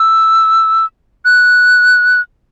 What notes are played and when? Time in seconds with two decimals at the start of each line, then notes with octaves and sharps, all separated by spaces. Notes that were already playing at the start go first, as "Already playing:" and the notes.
Already playing: E6
1.25 F#6